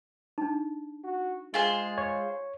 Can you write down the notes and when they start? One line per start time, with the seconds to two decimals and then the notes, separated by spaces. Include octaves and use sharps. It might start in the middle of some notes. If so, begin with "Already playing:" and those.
0.38 D4 D#4
1.04 F#4
1.54 G#3 F4 G#4 C5
1.98 C#5